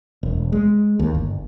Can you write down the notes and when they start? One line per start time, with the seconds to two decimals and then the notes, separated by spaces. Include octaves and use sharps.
0.23 E1
0.52 G#3
0.99 D#2
1.14 G1